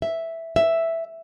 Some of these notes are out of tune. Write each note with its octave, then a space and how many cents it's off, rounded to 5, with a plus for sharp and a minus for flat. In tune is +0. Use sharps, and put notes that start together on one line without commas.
E5 +0
E5 +0